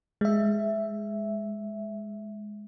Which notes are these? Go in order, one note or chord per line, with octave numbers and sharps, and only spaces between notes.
G#3 E5